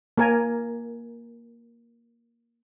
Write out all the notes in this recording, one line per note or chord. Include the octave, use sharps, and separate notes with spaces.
A#3 A#4 G#5